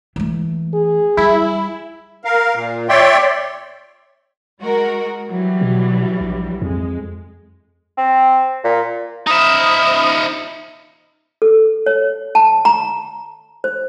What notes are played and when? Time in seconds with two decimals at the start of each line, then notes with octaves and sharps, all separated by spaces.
0.16 E3 A3
0.74 G#4
1.17 G3 E4
2.25 A#4 F5
2.54 A#2
2.89 C#5 D5 E5 G5 C6
4.60 G#3 F#4 A#4
5.29 E3 F#3 G3
5.61 B2
6.21 A#1
6.61 F2 G#3
7.97 C4
8.64 A#2
9.27 D#4 C5 E5 B5 D#6 F6
11.42 A4
11.86 C#5
12.35 A5
12.65 A#5
13.64 C5